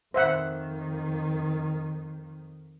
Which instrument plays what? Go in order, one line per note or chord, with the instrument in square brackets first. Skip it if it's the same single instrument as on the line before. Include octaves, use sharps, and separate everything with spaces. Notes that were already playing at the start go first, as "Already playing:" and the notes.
[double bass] F2 D#3 [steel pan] C5 E5 F#5